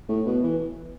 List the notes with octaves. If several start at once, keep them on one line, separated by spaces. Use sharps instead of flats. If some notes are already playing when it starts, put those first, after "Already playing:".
A2
B2
E3